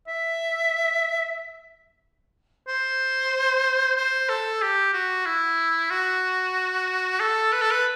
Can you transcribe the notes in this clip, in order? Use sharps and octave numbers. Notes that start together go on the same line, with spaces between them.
E5
C5
C5
A4
G4
F#4
E4
F#4
A4
B4
A4
B4